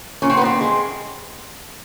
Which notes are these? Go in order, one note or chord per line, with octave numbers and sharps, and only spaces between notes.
A#2 C#4
C4
B3
A#2 C4
G#3